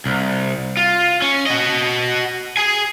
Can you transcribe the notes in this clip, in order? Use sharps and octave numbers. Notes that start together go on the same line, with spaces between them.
C2
F4
C#4
F#4 D#5
G#4 G#5